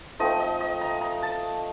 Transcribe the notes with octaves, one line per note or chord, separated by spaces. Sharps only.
F3 A3 C4 D#4 D#5
D#5
D#5
A#5
A#5
A5